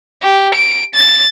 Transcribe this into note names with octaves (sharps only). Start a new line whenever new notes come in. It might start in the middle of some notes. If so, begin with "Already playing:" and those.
G4
D7
A6